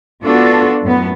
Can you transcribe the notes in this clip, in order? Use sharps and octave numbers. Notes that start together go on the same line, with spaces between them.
B3 D4 F4 F#4 A4
F#2 A2 B3